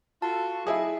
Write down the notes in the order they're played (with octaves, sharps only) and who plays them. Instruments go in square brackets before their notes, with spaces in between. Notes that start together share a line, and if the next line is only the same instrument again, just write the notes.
[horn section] F4 F#4 A4 [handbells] A5
[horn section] F#3 A4 D#5 [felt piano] E4 G#4